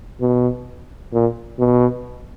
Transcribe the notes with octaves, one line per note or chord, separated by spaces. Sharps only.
B2
A#2
B2